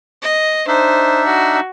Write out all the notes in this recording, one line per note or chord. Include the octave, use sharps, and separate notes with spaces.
D#5
D4 D#4 C5 E5
F#4